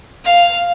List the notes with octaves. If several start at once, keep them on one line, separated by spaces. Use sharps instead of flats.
F5